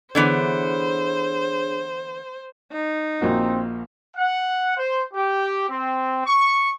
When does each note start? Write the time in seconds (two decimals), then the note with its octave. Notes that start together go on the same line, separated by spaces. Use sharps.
0.15 D3 E3 B3 D4 G#4 C5 C#5
2.72 D#4
3.21 A#1 A#3 C4 F#4
4.16 F#5
4.77 C5
5.14 G4
5.70 C4
6.26 C#6